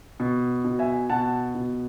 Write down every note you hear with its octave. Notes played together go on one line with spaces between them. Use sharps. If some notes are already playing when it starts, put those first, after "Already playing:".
B2
B2
E5 G#5
B2 F#5 A5
B2